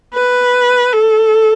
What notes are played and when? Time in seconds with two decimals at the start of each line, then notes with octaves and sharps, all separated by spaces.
0.14 B4
0.93 A4